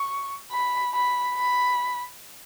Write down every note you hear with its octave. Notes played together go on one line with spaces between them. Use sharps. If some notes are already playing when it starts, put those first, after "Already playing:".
Already playing: C#6
B5
B5
B5